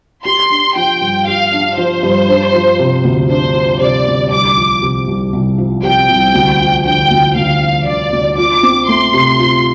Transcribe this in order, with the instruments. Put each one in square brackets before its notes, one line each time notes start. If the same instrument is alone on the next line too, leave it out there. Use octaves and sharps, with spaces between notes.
[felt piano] G4 [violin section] C6
[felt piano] D4
[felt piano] F3 [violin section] G5
[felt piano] G2
[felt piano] G4 [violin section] F5
[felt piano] D4
[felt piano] F3 [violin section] C5
[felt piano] G2
D4
F3
C3
D2
[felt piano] D4 [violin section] C5
[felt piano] F3
[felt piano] C3 [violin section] D5
[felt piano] D2
[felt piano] C2 [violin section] D6
[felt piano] F3
C3
C2
C2
F3
[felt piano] C3 [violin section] G5
[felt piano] C2
D2
F3
[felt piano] D3 [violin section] G5
[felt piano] D2
[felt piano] D2 [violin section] F5
[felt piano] F3
[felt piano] D3 [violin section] D5
[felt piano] D2
[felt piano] F4 [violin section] D6
[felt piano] C4
[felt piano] A3 [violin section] C6
[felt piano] C3
F4